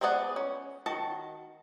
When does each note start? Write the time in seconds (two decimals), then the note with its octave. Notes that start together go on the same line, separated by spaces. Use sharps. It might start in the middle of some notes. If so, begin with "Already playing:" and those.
0.01 G#3 B3 G#4 D5 F#5
0.36 C#4
0.86 D#3 F#4 A5